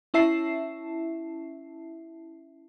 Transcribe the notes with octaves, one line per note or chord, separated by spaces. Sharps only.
C#4 E4 E5 A5 C7